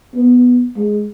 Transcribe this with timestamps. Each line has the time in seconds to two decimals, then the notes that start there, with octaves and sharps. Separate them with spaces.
0.15 B3
0.76 G#3